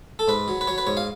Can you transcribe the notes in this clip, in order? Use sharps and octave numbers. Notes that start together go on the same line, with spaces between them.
A4
G#2 B4
F#3
B4
F#3 C#5
B4
G#2 C#5
F5